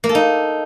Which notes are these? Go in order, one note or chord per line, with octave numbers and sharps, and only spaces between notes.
A#3
A4
D#4